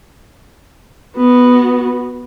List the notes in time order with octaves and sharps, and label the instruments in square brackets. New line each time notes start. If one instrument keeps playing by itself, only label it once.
[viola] B3 F#4